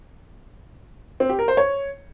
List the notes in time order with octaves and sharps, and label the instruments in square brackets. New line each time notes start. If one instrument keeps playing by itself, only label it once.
[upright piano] C4
G4
A#4
C5
C#5